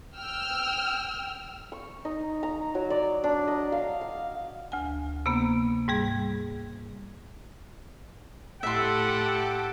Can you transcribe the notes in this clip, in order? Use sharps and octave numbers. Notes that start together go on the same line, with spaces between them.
G5 E6 F6
C#6
D#4
A#5
F#3
D5
D4
D#5
F5
F5
D2 G#5
C3 A#3 B3
G#2 G3 G#4
A2 G4 A4 E5 F#5 C6